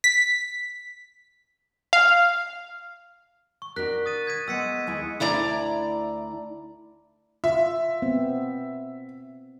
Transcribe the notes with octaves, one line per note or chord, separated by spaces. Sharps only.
B6
F5
C#6
D4 F#4 A#4 F#6 B6
D#6 A6 D#7
G#6 B6 D#7
G#3 B3 F#5 E6 B6 C#7
D#2 G#3 E4
D2 E4 D5 A#5
F4 E5
B3 C4